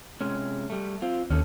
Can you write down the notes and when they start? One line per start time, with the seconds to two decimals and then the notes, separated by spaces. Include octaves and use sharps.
0.21 C3 G#3 C#4
0.70 G3 A3
1.02 C4 F4
1.30 D#2 C#4 A4